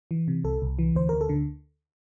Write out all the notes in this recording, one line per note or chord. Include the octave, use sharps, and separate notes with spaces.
E3
C3
C2 A4
C2
E3
D2 C5
D2 A#4
A4
D3